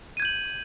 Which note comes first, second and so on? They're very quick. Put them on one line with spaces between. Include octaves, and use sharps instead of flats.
D#7 G#6 G6 F#7